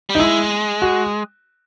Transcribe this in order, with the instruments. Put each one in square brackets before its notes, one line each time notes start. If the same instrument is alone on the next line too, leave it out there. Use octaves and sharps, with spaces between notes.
[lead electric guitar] G3
[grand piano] D#4
[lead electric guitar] G#3 [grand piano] E4
[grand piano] F#4